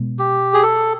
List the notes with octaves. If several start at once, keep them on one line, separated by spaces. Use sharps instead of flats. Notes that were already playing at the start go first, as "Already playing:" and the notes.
Already playing: B2 G#3 B3
G4
G#4
A4